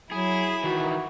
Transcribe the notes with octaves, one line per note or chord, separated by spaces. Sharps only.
F#3 E4 G#4
D#3 E3 F#4